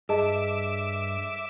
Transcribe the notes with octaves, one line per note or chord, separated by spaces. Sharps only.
G2 G#4 D#5 E5 A5 D6